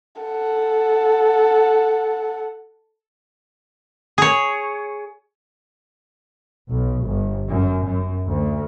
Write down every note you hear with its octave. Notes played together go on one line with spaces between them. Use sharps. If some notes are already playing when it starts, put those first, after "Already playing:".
A4 F#5
G#4 C#5
B1
G1
F#2
F#2
D2